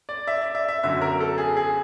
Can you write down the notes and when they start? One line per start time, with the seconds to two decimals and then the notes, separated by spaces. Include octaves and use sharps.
0.09 D5
0.27 E5
0.41 D5
0.55 E5
0.69 E5
0.83 G1 F#2 D3 F#3 E5
1.01 A#4
1.21 A4
1.38 G#4
1.57 G#4